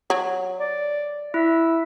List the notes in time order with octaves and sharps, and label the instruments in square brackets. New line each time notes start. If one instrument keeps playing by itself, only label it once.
[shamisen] F#3
[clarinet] D5
[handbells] E4 [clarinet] E5